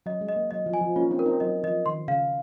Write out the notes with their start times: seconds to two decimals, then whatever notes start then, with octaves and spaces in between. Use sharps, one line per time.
0.06 F#3 D#5
0.21 G#3
0.29 D#5
0.36 A#3
0.51 F#3 D#5
0.66 F3
0.73 G#5
0.81 F3
0.96 A#3 C#4 F4
1.11 C4 D#4
1.19 A#4
1.26 C4 D#4
1.40 F#3 D#5
1.63 F3 D#5
1.86 D#3 C6
2.08 C#3 F5